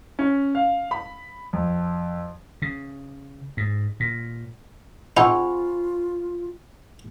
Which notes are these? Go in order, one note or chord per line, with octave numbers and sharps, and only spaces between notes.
C#4
F5
B5
F2
C#3
G#2
A#2
C4 D#4 F4 G#4 F#5 B5 C#6